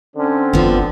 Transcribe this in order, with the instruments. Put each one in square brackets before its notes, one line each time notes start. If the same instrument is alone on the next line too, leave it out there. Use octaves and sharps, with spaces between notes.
[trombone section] D3 C4 [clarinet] C#4
[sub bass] G1 [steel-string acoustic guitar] F3 B3